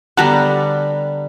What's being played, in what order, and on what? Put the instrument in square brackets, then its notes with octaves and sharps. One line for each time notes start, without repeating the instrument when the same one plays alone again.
[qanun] D3 G3 B3 [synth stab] F#5 A5 A#5